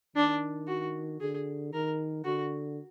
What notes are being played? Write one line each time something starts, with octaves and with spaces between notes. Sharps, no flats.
D#3 D4
F#4
D3 G#4
D#3 A#4
D3 F#4